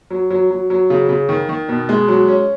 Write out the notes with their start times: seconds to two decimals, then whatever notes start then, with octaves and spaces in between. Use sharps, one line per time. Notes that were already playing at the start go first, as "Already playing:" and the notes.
0.10 F#3
0.30 F#3
0.51 F#3
0.70 F#3
0.90 C#3
1.09 C#3
1.29 D#3
1.49 D#3
1.69 B2
1.89 G#3
2.08 F#3
2.28 C#4